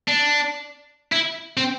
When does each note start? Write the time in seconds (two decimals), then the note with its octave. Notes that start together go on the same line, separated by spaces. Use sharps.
0.08 D4
1.12 E4
1.57 C4